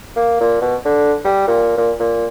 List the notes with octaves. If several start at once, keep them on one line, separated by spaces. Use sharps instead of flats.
A#3
A#2
B2
D3
G3
A#2
A#2
A#2